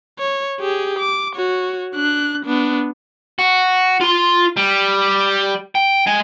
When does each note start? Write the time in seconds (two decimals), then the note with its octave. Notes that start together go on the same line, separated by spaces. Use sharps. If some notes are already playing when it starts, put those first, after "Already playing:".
0.19 C#5
0.60 G4 G#4
0.99 D6
1.36 F#4 C#5
1.95 D4 F#6
2.45 B3 D4
3.39 F#4
4.01 F4 C6
4.57 G3
5.75 G5
6.07 G#3 G#5